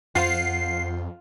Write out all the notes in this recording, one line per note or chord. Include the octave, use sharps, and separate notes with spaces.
F2 F4 C5 F5 F#5 C7